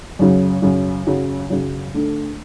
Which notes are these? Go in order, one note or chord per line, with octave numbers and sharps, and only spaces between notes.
F#2 C#3 F#3
F#2 C#3 F#3
F#2 C#3 F#3
F#2 C#3 F#3
D3 A3 D4